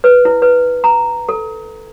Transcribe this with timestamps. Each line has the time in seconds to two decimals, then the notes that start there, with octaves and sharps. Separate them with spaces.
0.04 B4
0.25 E4
0.42 B4
0.84 A#5
1.29 A4